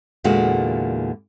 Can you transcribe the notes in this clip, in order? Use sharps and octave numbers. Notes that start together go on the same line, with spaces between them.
E2 A#2 D3 G#3 A#3 F#4